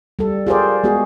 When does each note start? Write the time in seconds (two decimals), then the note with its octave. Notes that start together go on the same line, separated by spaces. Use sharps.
0.19 G3 A4
0.47 F4 G4 G#4 A#4 C5 D5
0.84 G#3 B3 F#4 G#4